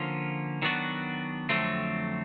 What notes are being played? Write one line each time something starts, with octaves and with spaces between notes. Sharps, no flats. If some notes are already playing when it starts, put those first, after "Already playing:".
Already playing: D3 F3 A#3 C#4 F4
D#3 F#3 B3 D4 F#4
F2 D3 F#3 A3 C4